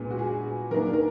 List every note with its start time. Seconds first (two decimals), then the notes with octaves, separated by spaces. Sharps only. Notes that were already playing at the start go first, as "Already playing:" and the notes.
Already playing: A#2 G#3 B3 D4
0.11 F#4
0.19 G#4
0.71 D#2 D#3 A#3 D4 A#4
0.93 A#4